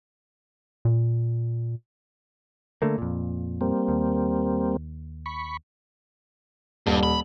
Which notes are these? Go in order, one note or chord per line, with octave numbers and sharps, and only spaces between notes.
A#2
D3 A3 A#3
F2 A#2
G3 A#3 C4
D#2
B5 C#6
D#1 G2
B5